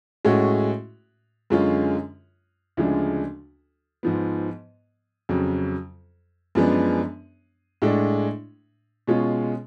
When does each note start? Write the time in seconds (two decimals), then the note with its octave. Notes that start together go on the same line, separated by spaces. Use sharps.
0.25 A2 G#3 C#4 F#4
1.50 F#2 D3 G#3 C#4 F4
2.77 D2 C#3 F3 G#3 D4
4.03 G#2 F3 B3
5.29 F2 C#3 F#3
6.55 F#2 F3 G#3 B3 D4
7.82 A2 G#3 D4
9.07 B2 G#3 C#4 F4